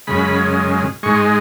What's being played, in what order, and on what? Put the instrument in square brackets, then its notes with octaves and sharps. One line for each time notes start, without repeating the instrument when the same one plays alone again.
[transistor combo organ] F#2 C#3 G#3 B5
G#2 G#3 C#6